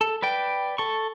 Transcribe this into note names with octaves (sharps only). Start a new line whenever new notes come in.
A4
B4 D5 G5
A4 C#6